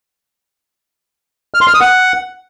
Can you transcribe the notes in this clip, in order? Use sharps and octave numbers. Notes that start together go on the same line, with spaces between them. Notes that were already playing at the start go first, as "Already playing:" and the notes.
F6
C6
F6
D#6
F#5